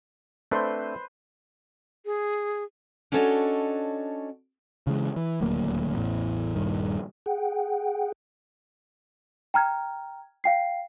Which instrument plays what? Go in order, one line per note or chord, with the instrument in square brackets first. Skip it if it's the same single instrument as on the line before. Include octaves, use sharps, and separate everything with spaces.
[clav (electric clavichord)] A3 C4 D4 [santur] B4 C5 C6
[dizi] G#4
[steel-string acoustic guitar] C#4 D4 F#4 A4 C#5 D#5
[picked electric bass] C#3 E3 G#3
E3
D#1 D2 F#3 A#3
A1 E2 A2
D#1 G2 D#3
[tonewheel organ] G#4 F#5 G5
[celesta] G5 A#5 F6 G#6
F5 G5 C7